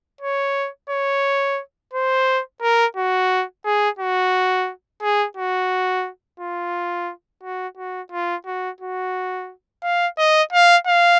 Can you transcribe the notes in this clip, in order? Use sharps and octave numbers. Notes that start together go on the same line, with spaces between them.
C#5
C#5
C5
A#4
F#4
G#4
F#4
G#4
F#4
F4
F#4
F#4
F4
F#4
F#4
F5
D#5
F5
F5